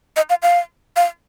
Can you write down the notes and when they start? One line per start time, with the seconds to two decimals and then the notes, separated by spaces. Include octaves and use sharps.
0.16 D#5
0.30 F5
0.43 F5
0.96 F5